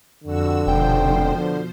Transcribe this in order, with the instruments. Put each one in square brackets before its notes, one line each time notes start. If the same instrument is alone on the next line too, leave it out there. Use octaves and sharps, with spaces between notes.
[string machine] F2 F#4 E6 [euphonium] D3
[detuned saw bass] F1 [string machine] B2 F3 C5 [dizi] G5
[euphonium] D3